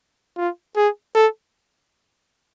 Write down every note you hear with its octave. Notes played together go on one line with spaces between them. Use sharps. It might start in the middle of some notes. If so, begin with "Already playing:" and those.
F4
G#4
A4